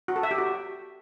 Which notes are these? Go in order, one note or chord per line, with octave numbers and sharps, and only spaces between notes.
F#4
A4
E5
G4
F#4